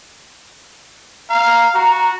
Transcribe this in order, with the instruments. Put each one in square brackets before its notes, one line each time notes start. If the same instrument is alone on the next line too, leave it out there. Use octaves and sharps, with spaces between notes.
[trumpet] F5 [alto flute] A#5
[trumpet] F#4